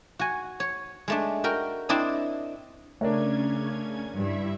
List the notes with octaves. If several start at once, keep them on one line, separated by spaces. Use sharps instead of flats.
F#4 G#5
C#5
G#3 A3 D4
F#4 A#4 G5
C4 D4 E4 D#5
C#3 A3 C#4 D4 A#4 C#5 G#6
G2 E4 E5